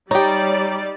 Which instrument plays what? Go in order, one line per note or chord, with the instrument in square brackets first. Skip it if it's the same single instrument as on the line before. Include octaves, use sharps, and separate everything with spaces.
[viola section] G3 D5 [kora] D#4 G4 [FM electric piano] C#5 A#5